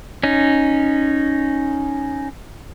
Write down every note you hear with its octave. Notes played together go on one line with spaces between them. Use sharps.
C#4 D#4